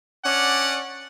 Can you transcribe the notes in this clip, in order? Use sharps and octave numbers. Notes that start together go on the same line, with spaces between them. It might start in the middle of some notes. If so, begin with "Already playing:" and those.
C#4 D4 D5 F#5